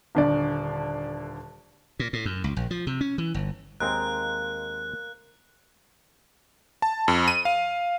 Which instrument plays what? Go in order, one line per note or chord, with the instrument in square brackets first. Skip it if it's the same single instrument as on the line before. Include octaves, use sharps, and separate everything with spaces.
[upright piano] D#1 D3 D5
[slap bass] A#2
A2
F#2
C#2
A#1
F3
C3
C#4
E3
G1
[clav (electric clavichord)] D#2 G#3 C4 [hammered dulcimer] A#4 F5 [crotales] F#6
[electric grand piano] A5
F2
D#7
F5